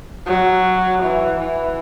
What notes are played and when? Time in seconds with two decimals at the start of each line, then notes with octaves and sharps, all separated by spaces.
0.26 F#3
1.03 E3
1.40 E3